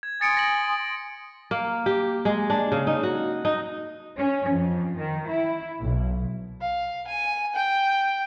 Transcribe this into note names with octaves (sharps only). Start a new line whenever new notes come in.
G#6
G#5 C6 D#6 A6 C#7 D7
A#6 F#7
A#3
G4
G#3
D4
C#3
D#4
F#4
D#4
C#4
F2
D#3
E4
B1
F5
G#5
G5